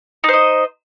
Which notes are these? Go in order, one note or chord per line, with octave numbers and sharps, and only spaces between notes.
D#4 C5 D#5